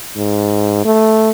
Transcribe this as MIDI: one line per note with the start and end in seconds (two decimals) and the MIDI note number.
0.16 0.84 44
0.85 1.31 57